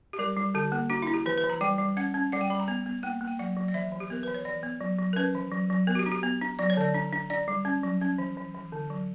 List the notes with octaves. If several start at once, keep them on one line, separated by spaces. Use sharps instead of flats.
G4
G3 A#4
G3
D3 G4
A#3
D4 F#4
E4
D4
G4
E3 B4
B4
E3
A#5
G3 G5
G3
C#4 F#5
C#4
G3 F#5
G5
G3 B5
A#5
B3
B3
A#3 G5
A#3
G5
F#3 F#5
F#3
D5
E3 E5
E3
G4
B3 A#4
E3 B4
C#5
E3 D5
B3
F#3
F#3
A#4
C#4 B4
E3
F#3
F#3
B3 A#4
F#4
G4
D4
G4
B3
D4
F#3 D5
C#5
D3 D5
D4
D4
D4 D5
G3
C#4
F#3
C#4
E3
E3
E3
D3
F#3